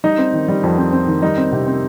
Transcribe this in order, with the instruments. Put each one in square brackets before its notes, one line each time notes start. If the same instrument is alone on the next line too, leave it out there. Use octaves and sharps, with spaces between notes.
[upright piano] G3 D#4
C4
D#3
G3
F2
C4
C4
D#3
G3 D#4
C4
C3
C4